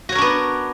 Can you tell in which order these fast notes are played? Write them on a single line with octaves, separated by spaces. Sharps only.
F#4 C#5 A#4 D4 B3